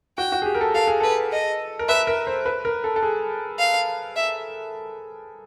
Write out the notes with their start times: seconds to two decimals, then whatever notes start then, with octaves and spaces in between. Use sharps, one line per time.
0.18 F#4 G5
0.32 F#4
0.42 G#4
0.46 G4
0.55 A#4
0.61 A4
0.75 A4 F5
0.87 G#4
1.00 A4 B4
1.32 D#5
1.79 A#4
1.88 B4 E5
2.07 A#4
2.27 C5
2.46 B4
2.65 A#4
2.84 A4
2.96 A4
3.03 G#4
3.59 F5
4.16 E5